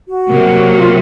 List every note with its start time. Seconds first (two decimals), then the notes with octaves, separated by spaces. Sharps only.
0.08 F#4
0.28 C3 F#3 A#3
0.77 F4